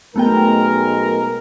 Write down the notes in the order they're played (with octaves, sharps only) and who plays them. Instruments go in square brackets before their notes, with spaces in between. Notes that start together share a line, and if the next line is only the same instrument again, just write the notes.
[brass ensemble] B1 G#3 A#4 [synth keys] A3 B3 G5